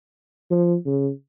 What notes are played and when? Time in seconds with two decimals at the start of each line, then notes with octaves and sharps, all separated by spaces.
0.51 F3
0.86 C#3